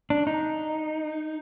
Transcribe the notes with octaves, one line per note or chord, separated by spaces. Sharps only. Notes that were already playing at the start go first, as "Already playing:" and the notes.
D4
D#4